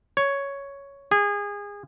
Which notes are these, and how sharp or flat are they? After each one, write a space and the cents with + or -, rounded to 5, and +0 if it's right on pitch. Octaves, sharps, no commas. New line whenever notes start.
C#5 +5
G#4 -25